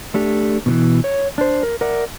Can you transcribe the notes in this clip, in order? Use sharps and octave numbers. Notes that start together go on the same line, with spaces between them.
A3 D4 G4
B2 D#3 E3
C#5
D4 C5
A#4
A#4 D5 E5 F#5